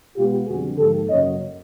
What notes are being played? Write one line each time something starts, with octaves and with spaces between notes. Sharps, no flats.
B2 G#3 B3 F4 G4
F2 D3 G3 F#4 G#4
G#2 F3 A#3 G4 A4
F#2 C#3 F#3 A#3 C#5 D#5